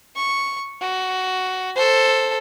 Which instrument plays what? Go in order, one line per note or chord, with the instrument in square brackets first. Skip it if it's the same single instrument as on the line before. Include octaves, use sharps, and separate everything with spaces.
[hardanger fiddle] C#6
F#4
A4 C5